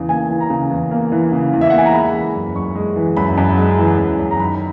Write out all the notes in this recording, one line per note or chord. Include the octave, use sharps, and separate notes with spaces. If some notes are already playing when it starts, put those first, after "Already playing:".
Already playing: E2 C#3
A#3 G#5
E3
A#5
C#3
E2
A#3
E3
C#3
E2
E5
A#3 F#5
G#5
A#5
G#3 B5
E3
F#2
F#2 C#6
G#3
E3
F#2 B5
F#2
G#3
E3
F#2
F#2
A#5
D#3 B5